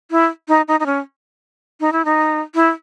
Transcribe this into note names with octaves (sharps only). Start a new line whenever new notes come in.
E4
D#4
D#4
D#4
C#4
D#4
E4
D#4
E4